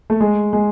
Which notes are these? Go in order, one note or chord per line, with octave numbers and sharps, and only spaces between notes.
A3
G#3
G#3